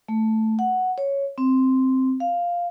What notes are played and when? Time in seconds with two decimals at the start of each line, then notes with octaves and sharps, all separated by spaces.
0.08 A3
0.59 F#5
0.98 C#5
1.38 C4
2.20 F5